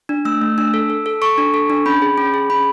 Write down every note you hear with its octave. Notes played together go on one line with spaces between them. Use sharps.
D4
A3 E6
A3
D4 E6
A4
A4
A4
A4 C#6
D4
A4
D4
C#4 B5
G#4
C#4
G#4
C#4 B5